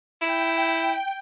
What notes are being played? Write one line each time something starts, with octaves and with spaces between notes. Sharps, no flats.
E4 G5